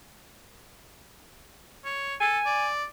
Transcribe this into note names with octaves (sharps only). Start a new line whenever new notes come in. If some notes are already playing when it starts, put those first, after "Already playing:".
C#5
A4 G#5
D5